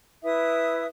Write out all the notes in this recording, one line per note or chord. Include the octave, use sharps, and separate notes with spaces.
E4 B4 E5 D#6